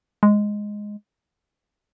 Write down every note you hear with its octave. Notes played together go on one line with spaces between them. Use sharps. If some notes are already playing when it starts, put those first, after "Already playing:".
G#3